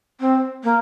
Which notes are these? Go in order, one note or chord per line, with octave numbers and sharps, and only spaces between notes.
C4
A#3